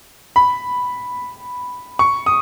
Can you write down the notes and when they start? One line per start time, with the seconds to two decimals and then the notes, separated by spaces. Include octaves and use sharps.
0.36 B5
1.99 C#6
2.26 D#6